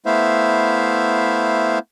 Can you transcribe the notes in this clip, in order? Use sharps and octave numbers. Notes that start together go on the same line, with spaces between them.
A3 B3 E4 C5 E5 F5